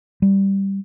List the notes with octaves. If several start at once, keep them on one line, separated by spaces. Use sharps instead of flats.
G3